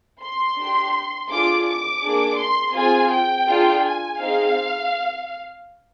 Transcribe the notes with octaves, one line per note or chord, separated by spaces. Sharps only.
C6
D4 G4
D4 F4 G#4 D6
D6
A#3 D4 G#4
C6
C4 F4 G#4 G#5
G5
D4 F4 G#4
G#5
C4 D#4 G#4 F5